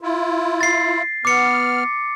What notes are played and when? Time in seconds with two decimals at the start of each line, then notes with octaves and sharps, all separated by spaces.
0.01 E4 F4
0.61 A6 C7
1.25 B3 D6 F6 C#7